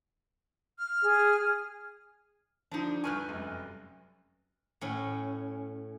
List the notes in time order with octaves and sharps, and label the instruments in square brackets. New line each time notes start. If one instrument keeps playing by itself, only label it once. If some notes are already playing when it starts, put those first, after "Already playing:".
[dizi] F6
[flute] G#4
[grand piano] D3 F3 [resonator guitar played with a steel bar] D4 D#4
[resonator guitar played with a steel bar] G2 B4 G#5 [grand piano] C#6 F6 G6
[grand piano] F1 F#2
[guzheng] A2 C#4